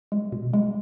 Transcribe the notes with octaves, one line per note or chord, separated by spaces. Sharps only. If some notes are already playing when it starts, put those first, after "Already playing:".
G#3
B2
G#3